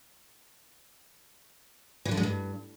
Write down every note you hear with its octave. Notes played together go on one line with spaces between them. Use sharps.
E3
D3
G#3
G2